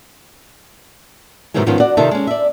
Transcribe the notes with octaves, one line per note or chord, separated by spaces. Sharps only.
G#2 C3 D#3 E3 F#3 G#3
G#2 D#3 F3 B3 C#4 F4
F#4 D5 F#5
C3 D#3 D#4 F4 A4 E5
G#3 C#4
D5 E5